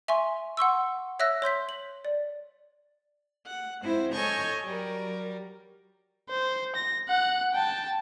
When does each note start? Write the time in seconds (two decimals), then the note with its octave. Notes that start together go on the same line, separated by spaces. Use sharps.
0.08 E5 G#5 C6 C#6
0.57 F#5 C6 C#6 E6
1.19 C#5 E5 E6 F#6 A#6
1.42 C#5 C6 G6 B6
1.69 F#7
2.05 D5
3.47 F#5
3.81 G#3 C4 E4 C5
4.13 A4 C#5 D#5 G#5 C#6 G6
4.64 F#3 G3 A#4
6.30 C5
6.76 A#6
7.08 F#5 F#6
7.53 G5 A5